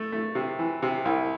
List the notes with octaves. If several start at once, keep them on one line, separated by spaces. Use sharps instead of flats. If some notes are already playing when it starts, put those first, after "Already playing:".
Already playing: A3
A3
C3
E3
C3
C2